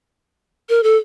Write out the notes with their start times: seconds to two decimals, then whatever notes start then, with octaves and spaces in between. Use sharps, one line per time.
0.69 A#4
0.83 A4